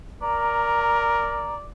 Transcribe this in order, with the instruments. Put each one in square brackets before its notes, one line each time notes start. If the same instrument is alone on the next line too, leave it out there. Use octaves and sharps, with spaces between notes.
[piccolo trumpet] A#4 [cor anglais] D5 [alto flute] A#5